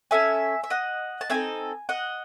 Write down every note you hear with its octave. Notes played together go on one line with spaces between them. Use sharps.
C#4 F#4 A4 E5 G#5
E5
D#5 F#5
A5
C4 D#4 A4 E5 G#5
D#5 F#5